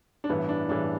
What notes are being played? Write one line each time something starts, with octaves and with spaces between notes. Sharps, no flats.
D4
A1 G2 E3 B3
D4
A1 G2 E3 D4